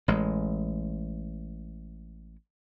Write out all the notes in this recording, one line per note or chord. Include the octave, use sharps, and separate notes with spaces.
A1 G#3